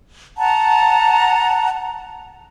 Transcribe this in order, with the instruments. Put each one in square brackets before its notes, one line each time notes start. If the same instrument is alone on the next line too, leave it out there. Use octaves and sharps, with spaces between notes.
[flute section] F#5 A5 A#5